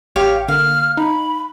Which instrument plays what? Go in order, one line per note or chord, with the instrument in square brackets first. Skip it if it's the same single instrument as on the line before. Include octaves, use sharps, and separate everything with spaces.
[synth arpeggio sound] A1 [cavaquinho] G4 C#5 F5
[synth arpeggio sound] D3 A#3 [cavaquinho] F5 [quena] F6
[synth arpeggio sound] D#4 [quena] B5